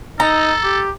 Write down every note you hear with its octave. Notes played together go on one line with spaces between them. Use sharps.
D#4 A4 A#5
G4